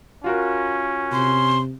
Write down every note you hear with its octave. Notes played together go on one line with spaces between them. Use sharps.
C#4 F4 F#4 A#4
C3 C6